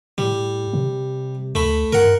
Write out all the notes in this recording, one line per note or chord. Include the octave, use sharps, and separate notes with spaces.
A2 G3
C3
D2 A3 B5
G2 A#4 F#5